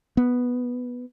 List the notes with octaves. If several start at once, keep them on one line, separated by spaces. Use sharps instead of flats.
B3